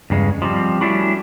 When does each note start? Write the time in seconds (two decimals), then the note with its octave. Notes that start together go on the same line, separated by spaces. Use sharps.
0.10 E2 G2 C#3 G#3
0.42 F3 G3 C4
0.81 G3 A3 C#4 D4 E4 F#4